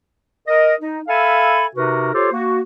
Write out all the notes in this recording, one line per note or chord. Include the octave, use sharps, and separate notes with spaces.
A#4 D#5
D#4
A4 E5 F5 G#5 B5
C3 D#4 F#4 A#4 B4
F4 G4 A4 C5 C#5
A#3 F#4